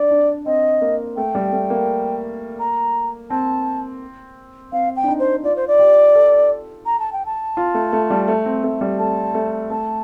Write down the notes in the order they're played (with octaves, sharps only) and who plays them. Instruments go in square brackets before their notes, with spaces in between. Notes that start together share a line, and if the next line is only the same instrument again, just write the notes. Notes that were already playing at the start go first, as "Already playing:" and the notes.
Already playing: [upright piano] D4 [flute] D5
[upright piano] D4
[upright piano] C4 [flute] D#5
[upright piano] A#3
[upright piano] A3 [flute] G5
[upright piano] G3
A3
A#3
[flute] A#5
[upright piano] C4 [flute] A5
[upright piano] C4 [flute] F5
[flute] G5
[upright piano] D4
D#4
[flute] C5
[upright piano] F4 [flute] D5
[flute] C5
D5
[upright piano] G4
A4
[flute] A#5
A5
G5
A5
[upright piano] F4
A3
A3
G3
A3
C4
A3
G3
[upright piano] A3 [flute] A5
[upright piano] A3
[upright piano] A3 [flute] A5